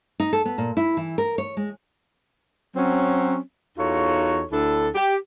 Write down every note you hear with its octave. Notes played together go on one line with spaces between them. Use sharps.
D#4
A4
B3
A#2
E4
E3
A#4
C#5
G#3
F#3 C4 C#4
E2 D#4 F4 F#4 A4 C#5
D2 D4 E4 A4
G4